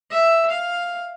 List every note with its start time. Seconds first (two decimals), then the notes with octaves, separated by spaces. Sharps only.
0.11 E5
0.50 F5